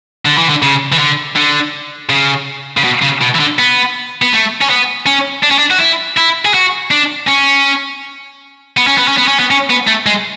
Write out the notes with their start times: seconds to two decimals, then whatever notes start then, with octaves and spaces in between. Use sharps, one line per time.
0.25 D3
0.38 E3
0.50 D3
0.62 C#3
0.92 E3
0.99 D3
1.36 D3
2.10 C#3
2.77 C#3
2.84 B2
3.02 C#3
3.22 B2
3.35 E3
3.40 D3
3.59 B3
4.22 B3
4.33 A3
4.61 C#4
4.70 B3
5.07 C#4
5.43 D4
5.51 C#4
5.59 D4
5.71 F#4
5.80 E4
6.17 E4
6.45 G#4
6.54 F#4
6.91 D4
7.28 C#4
8.77 B3
8.87 C#4
8.98 B3
9.08 C#4
9.18 B3
9.28 C#4
9.39 B3
9.51 C#4
9.70 B3
9.87 A3
10.06 G#3